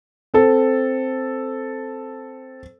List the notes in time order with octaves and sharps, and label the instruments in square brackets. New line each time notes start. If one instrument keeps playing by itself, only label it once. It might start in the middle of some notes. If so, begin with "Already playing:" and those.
[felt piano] C4 A4